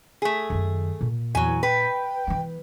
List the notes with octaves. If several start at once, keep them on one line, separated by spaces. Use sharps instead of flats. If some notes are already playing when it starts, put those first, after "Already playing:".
A3 G#4
F#2 D#3
A#2
E2 F#3 G#5
B4 G5
E3 B3